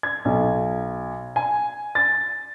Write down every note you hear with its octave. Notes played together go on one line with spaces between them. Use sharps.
G#6
B1
G#5
A6